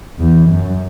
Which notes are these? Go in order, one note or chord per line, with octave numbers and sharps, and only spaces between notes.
E2
F#2